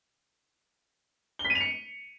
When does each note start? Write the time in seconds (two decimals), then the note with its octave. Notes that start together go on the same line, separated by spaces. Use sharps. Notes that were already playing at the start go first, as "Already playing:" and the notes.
1.39 G7
1.45 B6
1.50 D#7
1.55 F7
1.61 C#7